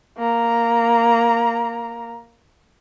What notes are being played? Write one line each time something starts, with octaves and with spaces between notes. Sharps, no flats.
A#3 A#5